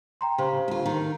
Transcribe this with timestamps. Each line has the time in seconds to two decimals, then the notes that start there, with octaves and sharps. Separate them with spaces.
0.21 G5 A#5 C6
0.38 C#3 G4 C5
0.68 D2 F4
0.86 D#3